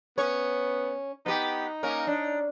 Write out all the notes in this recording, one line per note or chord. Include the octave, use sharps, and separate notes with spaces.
B3 C#4 C#5
B3 D#4 G4
A#3 C#4 A#4
D4